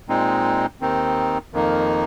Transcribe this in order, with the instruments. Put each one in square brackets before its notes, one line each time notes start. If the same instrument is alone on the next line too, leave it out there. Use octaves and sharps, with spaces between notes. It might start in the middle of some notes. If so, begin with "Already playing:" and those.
[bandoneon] A#2 G#3 C4 D#4
D#2 D#3 C4 D#4
F2 D#3 A#3 D#4